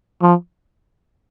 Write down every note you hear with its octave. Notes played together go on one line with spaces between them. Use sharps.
F3